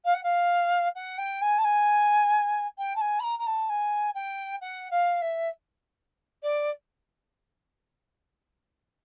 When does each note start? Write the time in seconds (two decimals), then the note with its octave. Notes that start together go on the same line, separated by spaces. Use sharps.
0.05 F5
0.14 F#5
0.23 F5
0.95 F#5
1.18 G5
1.41 G#5
1.58 A5
1.64 G#5
2.78 G5
2.96 A5
3.01 G#5
3.19 B5
3.23 A#5
3.39 A#5
3.47 A5
3.69 G#5
4.15 G5
4.61 F#5
4.91 F5
5.21 E5
6.43 D5